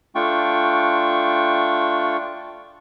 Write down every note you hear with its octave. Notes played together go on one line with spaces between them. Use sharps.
A3 D4 F4 G5 C#6